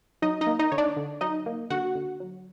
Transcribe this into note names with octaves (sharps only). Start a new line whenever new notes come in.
F#3 D#4 D#5
D#4 D#5
A#3
D#4 D#5
D3 C#5
D4 D5
D3
F#3 D#4 D#5
A#3
D3 F#4 F#5
D3
F#3